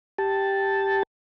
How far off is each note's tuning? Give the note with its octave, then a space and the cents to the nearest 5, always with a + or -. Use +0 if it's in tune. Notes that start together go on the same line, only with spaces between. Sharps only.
G4 +0 A5 +0